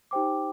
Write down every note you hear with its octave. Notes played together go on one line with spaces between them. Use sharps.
D#4 G4 C5 G5 D6